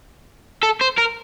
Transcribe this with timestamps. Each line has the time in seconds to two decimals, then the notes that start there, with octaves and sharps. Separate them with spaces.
0.63 A4
0.81 C5
0.98 A#4